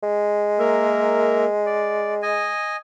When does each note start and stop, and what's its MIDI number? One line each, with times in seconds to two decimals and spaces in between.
0.03 2.50 56
0.59 1.45 58
0.59 1.45 70
0.59 1.45 76
1.66 2.14 74
2.22 2.76 75
2.22 2.76 80